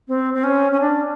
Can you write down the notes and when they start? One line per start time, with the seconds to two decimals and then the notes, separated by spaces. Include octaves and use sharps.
0.08 C4
0.34 C4
0.44 C#4
0.72 C#4
0.81 D4